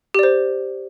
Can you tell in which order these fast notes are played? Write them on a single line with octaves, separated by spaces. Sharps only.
G4 D5 C5